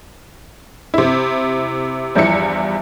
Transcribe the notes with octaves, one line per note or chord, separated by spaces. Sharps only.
C3 E4
E2 G2 F3 E4 C#7